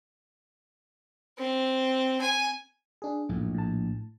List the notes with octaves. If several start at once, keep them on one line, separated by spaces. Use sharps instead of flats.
C4
G#5
D4 G#4
A#1 F#2 A2
A2 A5